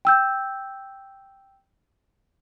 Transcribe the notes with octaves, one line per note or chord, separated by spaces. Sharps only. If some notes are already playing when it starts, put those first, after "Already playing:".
G5 E6 G6